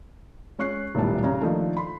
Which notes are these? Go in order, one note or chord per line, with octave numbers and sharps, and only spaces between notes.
G#3 C#4 C#6 F#6 C7
D#1 B1 A2 G3 A5
C#3 C#4 G4 A#5
D#3 F3 A3 A#3 D4 D#4
B5 C6